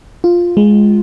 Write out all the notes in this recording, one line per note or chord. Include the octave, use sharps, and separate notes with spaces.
F4
G#3